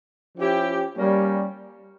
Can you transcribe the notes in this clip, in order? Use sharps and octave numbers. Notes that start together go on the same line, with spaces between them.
F3 C#4 E4 G4
G3 A#3 C#4